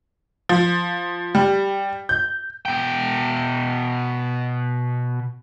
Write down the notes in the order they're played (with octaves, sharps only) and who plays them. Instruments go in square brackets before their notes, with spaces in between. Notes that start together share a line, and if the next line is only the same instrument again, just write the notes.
[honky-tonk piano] F3
G3
G6
[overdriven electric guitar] B2 G5